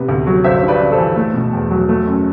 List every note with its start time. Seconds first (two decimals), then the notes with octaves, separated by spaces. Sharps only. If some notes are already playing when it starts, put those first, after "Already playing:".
Already playing: C3 B3
0.09 D2
0.27 F#3
0.44 G1 C5 E5
0.63 G2
0.68 B4 D5
0.81 G1
0.92 A4 C5
0.98 E3
1.16 A3
1.34 B2
1.53 E2
1.70 F#3
1.89 A3
2.07 F#2